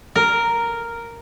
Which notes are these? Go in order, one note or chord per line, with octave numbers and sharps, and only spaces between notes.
A#4